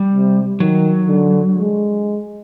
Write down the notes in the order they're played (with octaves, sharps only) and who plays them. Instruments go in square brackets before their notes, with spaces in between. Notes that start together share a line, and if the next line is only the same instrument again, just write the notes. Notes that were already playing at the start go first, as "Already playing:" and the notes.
Already playing: [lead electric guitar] G3
[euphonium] C3
[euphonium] D#3 [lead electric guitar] F#3
[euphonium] D3
G#3